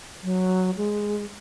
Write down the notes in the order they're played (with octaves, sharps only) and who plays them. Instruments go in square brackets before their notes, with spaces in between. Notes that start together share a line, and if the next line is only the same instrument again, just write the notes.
[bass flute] F#3
G#3